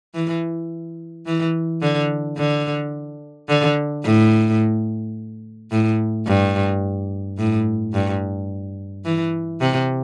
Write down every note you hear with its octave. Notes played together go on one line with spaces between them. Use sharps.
E3
E3
D3
D3
D3
A2
A2
G2
A2
G2
E3
C3